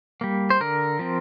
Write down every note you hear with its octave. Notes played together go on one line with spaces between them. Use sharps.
G3 A#3
C5
D3 A#4
F3 C4